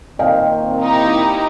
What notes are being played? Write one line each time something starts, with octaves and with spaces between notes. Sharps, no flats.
A#2 D#3 C4 D#5 F5 G5
D#4 E4 G4